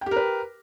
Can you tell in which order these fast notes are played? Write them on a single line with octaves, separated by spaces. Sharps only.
G5 G4 A#4 B4